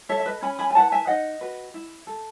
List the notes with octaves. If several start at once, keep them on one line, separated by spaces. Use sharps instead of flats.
A4 C#5 E5
E5
B4 D#5
C#4 G#5 B5
G#5 B5
G#5
E4 B4 F#5 A5
E5 G#5
D#4 D#5 F#5
F#4 B4
E4
A4